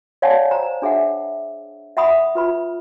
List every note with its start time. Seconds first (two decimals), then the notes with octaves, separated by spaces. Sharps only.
0.22 C#5 D5 F5 F#5 G#5 A5
0.51 C5 A#5
0.82 D4 G#4 E5 F#5
1.97 E5 F#5 B5 D#6
2.35 F4 B4 B5